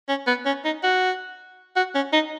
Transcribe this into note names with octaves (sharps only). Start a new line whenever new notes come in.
C#4
B3
C#4
D#4
F#4
F#4
C#4
D#4